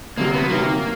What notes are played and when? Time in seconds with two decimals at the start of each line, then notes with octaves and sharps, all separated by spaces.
0.18 D2 C3 D#3 F#3 A#3
0.33 B3
0.49 D2 C3 D#3 F#3 A#3